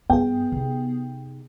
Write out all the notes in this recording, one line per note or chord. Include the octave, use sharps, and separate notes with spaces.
G2 B3 G#4 G5
C3 D#4